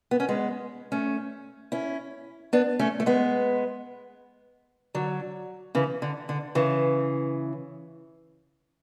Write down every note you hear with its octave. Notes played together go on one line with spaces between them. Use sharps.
B3
C#4
G#3 B3
A3 C#4
C#4 E4
B3 D4
A3 C#4
A3
G#3 B3
D3 F#3
C#3 E3
D3
D3
C#3 E3